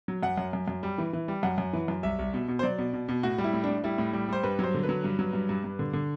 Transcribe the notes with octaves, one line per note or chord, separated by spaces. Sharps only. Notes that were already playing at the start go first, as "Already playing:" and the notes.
F#3
F#2 F#5
F#2
F#2
F#2
G3
E3
E3
G3
F#2 F#5
F#2
E3
F#2
C2 E5
C2
B2
B2
C5
F#3 D5
B2
B2
B2
A2 F#4
G3
E4
A2
A2 D4
G3 E4
A2
G3
G3 C5
G2 B4
F#3 C5
D3
B4
F#3
G2
F#3
G2
G2
G2
D3
D3